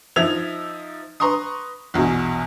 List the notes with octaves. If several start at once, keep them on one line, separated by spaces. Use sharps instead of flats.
F3 D#4 E5 G#6 F7
B4 A#5 C6 C#6 D#6
A#1 E2 B2